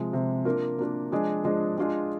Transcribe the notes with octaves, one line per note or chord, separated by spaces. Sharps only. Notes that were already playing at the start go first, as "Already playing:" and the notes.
Already playing: C3 F3 G#3
C3 F3 G#3
A#3 D4 F4 A#4
A#3 D4 F4 A#4
F3 G#3 D4 G#4 D#5
F3 G#3 D4 G#4 D#5
G#3 D4 F4 G#4 D#5